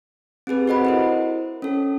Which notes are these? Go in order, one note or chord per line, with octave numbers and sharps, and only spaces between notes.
C4 G4 G#4 B4
F#4 A4 C5 D#5 F#5 B5
E4 A#4 C5
C#4 A4